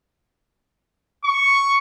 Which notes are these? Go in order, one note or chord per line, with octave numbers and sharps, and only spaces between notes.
C#6